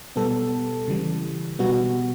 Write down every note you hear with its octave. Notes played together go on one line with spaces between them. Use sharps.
B2 G3 B3 A4
C#3 E3 G3
B2 G3 B3 F#4